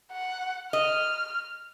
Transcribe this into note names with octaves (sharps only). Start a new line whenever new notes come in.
F#5
D#5 F6